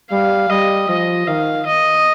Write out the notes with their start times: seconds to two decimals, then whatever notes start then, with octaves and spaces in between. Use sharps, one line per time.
0.12 G3 F5
0.49 G3 D#5
0.89 F3 D#5
1.27 D#3 F5
1.66 D#5